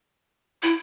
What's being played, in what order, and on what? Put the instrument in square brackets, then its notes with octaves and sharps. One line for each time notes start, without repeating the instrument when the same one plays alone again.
[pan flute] E4